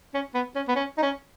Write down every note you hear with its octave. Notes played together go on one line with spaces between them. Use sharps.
C#4
B3
C#4
B3
C#4
D#4
C#4